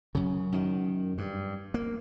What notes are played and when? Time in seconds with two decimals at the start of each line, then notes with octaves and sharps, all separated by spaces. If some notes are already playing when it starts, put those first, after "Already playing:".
0.15 F#2 C#3
0.52 F#2 D#3
1.18 G2
1.74 A#3